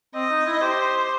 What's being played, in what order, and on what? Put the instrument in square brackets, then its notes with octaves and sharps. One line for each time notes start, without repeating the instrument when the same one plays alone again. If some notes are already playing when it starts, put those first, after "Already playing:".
[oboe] C4 [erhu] D#5
[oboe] D#4
E4
[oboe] G4 [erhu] C5